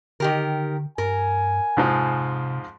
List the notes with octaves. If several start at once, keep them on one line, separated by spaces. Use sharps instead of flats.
D3 D#3 G4 A#4
G2 A#4 G#5
F2 G#2 C3 F3